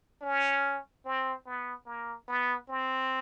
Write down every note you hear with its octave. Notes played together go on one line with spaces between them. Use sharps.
C#4
C4
B3
A#3
B3
C4